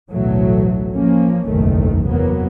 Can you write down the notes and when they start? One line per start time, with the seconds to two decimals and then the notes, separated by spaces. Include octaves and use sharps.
0.10 A1 D2 B2 E3 F#3 A3
0.92 F3 A#3 C#4
1.46 F#1 B1 E2 D#3 A3
2.07 E2 C3 F#3 A#3 B3